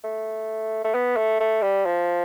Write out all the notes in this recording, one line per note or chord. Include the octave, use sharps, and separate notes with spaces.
A3
A3
B3
A3
A3
G3
F3